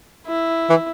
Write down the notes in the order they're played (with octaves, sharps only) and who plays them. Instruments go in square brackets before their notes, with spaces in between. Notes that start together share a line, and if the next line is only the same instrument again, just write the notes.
[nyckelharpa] E4
[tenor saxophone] E3